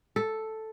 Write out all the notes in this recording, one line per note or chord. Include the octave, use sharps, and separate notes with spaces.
A4